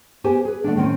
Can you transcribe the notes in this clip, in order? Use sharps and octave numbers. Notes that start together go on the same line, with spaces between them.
B3 G4 G#4 C5 G#5 A5
G#4 B4
D3 A3 D4
A2 D#3 C4 C#4